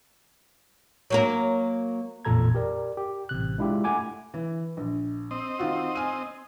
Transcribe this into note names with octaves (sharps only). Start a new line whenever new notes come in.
F#3 A#3 A#4
A1 F2 A#2 A4 A#5 G#6
G4 A#4 D5
G4
A1 C3 F#6
G#3 D4 E4 F4 G4
A3 F#5 G#5 D6
E3
A#1
C4 D#5
D#3 F4 F#4
G#5 F6 D#7